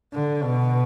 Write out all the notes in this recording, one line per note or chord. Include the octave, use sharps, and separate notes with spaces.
D3
B2